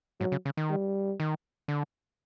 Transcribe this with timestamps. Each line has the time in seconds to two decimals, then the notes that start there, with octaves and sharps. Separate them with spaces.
0.20 G#2 F#3
0.32 C#3
0.45 C#3
0.57 D#3
0.70 G3
1.20 D#3
1.68 D3